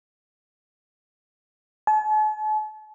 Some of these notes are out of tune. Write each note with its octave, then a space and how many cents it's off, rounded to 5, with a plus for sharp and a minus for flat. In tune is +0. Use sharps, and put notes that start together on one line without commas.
A5 -45